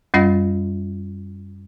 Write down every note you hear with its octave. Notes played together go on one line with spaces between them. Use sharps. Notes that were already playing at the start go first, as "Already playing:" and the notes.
F#2 G3 C#4 F4 D#5 A#6